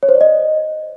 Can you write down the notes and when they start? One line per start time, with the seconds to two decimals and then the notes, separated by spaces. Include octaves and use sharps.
0.03 C#5
0.09 C5
0.15 D5
0.21 D#5